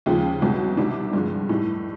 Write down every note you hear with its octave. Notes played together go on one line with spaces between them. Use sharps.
D#2 C#3 F3 G#3 F4
C2 B2 F#3
C2 C3 D#3 D4
G2 D3 F3 G#3
A2 E3 G3 D#4